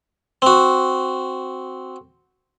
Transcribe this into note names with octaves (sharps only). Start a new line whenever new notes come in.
C4 F#4